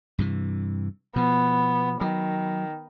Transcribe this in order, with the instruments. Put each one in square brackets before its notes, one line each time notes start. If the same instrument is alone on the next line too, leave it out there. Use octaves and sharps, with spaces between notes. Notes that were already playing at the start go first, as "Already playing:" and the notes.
[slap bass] G2 C3 E3
[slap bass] B2 F3 [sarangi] B3
[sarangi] D#3 [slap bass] F#3